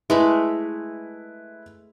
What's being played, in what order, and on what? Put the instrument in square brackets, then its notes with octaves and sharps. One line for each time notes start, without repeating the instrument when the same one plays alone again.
[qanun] G#3 A3 B5 [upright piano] E4 B4